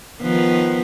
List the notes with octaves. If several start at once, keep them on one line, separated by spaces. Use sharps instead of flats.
D#3 F3 B3